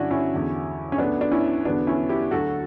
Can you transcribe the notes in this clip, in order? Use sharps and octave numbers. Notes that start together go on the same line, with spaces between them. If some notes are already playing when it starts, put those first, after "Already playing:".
Already playing: G2 D3 F#3 C#4 D4 E4 F#4
C#4 E4
E2 D3 F#3
C#4
D2 D3 F#3 B3 D4
D4
C#4 E4
E2 D3 F#3 B3 D4
C#4 E4
E4 G4
D2 D3 F#3 F#4 A4